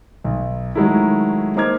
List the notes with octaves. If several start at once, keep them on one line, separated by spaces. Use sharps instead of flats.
B1
D#3 F#3 G#3 A3 D#4 E4
A#3 D#4 C5 D6 F6 G#6